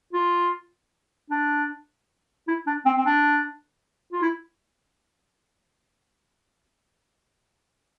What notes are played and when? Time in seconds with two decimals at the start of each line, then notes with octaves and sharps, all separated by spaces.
0.13 F4
1.30 D4
2.48 E4
2.67 D4
2.86 C4
2.98 C4
3.06 D4
4.12 F4
4.22 E4